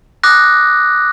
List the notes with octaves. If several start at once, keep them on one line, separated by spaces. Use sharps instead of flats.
D6 D#6 F#6 A#6